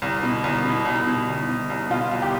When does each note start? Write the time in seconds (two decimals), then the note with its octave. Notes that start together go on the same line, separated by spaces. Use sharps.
0.02 C2
0.23 B2
0.44 C2
0.65 B2
0.85 C2
1.07 B2
1.28 C2
1.49 B2
1.70 C2
1.90 B2 F4
2.12 C2
2.22 G4